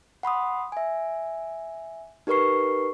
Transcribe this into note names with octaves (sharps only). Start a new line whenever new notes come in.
F#5 B5 C6 D#6
E5 G#5
D#4 G4 A#4 B4 C#6 C7